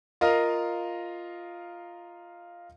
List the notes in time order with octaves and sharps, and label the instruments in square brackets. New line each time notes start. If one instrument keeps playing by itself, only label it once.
[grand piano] F4 A#4 D#5 F5